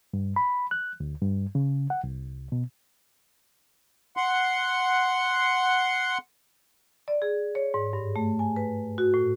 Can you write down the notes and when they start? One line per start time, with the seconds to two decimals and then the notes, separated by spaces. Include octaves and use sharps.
0.14 G2
0.36 B5
0.71 F#6
1.00 D2
1.22 G2
1.55 C#3
1.90 F#5
2.04 C2
2.52 B2
4.17 F#5 C6
7.08 D5
7.22 G#4
7.55 C#5
7.74 G#2
7.93 G2
8.16 A3
8.39 G#5
8.56 B4
8.98 F#4
9.14 A2